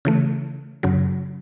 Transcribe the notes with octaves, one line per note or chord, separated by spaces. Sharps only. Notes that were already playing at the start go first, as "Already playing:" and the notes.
C#3 E3 A3
F#2 C#3 F#3